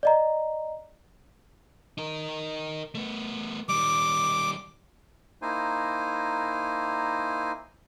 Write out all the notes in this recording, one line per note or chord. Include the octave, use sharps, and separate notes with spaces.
D5 D#5 A#5
D#4 A#4
A3 B3
D#3 G3 D6
A#3 D#4 E4 C5 G#5